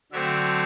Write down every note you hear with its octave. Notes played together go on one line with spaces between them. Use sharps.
D3 F#3 A3 C4 E5